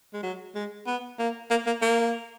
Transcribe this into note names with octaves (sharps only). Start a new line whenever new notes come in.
G#3
F#3
G#3
B3
A#3
A#3
A#3
A#3